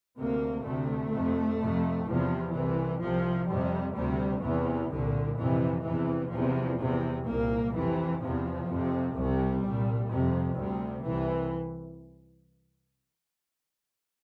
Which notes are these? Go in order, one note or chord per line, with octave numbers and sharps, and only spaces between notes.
D2 C3 A#3
D2 C3 A3
F2 C3
F2 C3
E2 C3 F3
C2 C3 E3
C2 C3 F3
F2 C3 G3
D2 C3 G3
E2 C3 E3
C2 A#2 D3
F2 C3 E3
E2 C3 E3
E2 C3 F3
E2 C3
C2 A#2 A#3
F2 C3 E3
E2 C3 F3
F2
C3
C2 C3 G3
C2 A#2
F2 C3
D2 C3 G3
C2 C3 E3